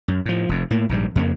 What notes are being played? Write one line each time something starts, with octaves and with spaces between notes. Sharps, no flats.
F#2
A2 F3
F1 F2
A2 A#3
A#1 G#2 D3 G3
F2 C#3 A3 A#3